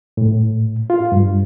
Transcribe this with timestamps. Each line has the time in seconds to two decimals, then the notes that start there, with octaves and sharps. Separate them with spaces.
0.17 A2
0.90 F4
1.12 G2